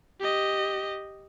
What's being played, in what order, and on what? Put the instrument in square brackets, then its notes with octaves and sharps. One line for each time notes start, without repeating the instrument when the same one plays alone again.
[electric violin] G4 D#5